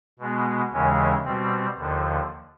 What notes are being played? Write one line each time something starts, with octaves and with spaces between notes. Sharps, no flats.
B2 G#3 B3
D#2 C#3 E3 G#3 C#4
B2 G3 C4
D#2 D3 F3